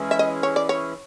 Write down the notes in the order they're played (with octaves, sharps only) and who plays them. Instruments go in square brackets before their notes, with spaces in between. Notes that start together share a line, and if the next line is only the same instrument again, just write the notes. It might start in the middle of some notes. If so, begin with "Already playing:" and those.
Already playing: [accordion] E3 G#3 C#4 E4 G#4
[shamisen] E5
D#5
C#5
D5
C#5